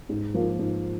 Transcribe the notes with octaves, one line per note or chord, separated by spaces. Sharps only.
G#2
F3 A#3
G#2